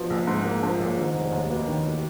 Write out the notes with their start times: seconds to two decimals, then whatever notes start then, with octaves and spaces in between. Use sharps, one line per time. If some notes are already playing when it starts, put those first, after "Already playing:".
Already playing: B2 F3
0.10 A#1
0.27 G#2
0.44 A#2 A#3
0.62 G#2 F3
0.79 A#1 F#2
0.97 G#2 D#3
1.14 F1
1.32 D#2
1.50 B2 A#3
1.67 D#3